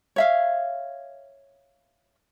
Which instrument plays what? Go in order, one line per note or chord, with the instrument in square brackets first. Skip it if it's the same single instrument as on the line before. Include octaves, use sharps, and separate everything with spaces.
[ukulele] C#5 E5 F5